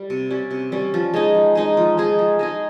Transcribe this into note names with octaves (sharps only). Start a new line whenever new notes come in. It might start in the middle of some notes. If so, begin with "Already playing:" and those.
Already playing: G3
C3
G3 C#4
C3
G3 C#4
F3
G#3 D#4 G#4
F3
G#3 D#4 G#4
F3
G#3 D#4 G#4
F3
G#3 D#4 G#4